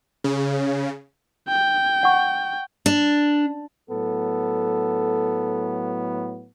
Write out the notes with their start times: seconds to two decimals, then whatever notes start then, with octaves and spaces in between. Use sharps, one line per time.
0.24 C#3
1.49 G5
2.03 F#5 C#6
2.86 D4
3.90 A2 F#3 B3 A4